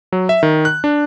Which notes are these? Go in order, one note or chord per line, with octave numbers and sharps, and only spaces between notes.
F#3
E5
D#3
F#6
D4